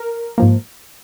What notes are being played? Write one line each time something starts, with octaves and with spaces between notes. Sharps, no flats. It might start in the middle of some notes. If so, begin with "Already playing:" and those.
Already playing: A#4
G#2 F3 A#3